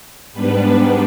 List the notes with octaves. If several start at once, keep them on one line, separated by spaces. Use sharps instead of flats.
G#2 G3 B3 D4 B4